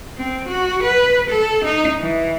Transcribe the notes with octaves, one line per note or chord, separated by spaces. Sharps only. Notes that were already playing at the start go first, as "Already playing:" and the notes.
C4
F#4
B4
A4
D#4
E3